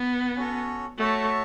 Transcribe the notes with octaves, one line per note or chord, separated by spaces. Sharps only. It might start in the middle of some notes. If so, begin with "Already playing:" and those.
Already playing: B3
C#4 F#4 A4 C#5
A3 F#4 C#5 E5 A5